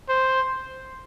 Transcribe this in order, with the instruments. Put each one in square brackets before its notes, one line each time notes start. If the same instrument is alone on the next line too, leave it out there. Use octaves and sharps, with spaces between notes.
[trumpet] C5